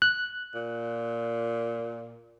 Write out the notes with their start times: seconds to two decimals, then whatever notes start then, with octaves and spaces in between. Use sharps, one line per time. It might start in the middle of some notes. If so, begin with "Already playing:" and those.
0.02 F#6
0.55 A#2